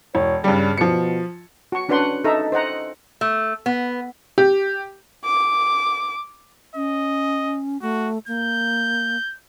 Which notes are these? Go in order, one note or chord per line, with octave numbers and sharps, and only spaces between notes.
E1 C#5
G2 C#3 G3
B2 F3 C#7
F#4 C#6
C#4 D4 F#4 B4 F#5 C6
D#4 A4 E5 A#5
C5 D#5 F#5 A#5
A3
B3
G4
D6
C#4 D#5
A3 F#4
A#3 G6